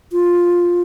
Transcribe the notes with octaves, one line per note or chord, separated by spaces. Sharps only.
F4